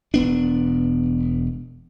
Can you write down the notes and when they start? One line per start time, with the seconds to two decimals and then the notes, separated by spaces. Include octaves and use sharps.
0.14 E1 B3 D4